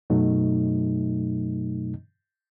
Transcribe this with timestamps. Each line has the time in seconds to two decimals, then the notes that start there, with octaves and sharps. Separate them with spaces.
0.10 F#2 B2 F#3 A3 D#4